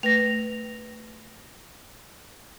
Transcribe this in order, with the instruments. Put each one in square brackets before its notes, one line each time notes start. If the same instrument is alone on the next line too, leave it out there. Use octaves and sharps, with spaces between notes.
[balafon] A3 B4 [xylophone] A#6 F7